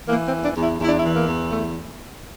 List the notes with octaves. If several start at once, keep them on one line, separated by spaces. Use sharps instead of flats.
E3 A#3
C4
E2
D4
E2
E4
E2 E4
D4
E4
E3
A#3
E2
A3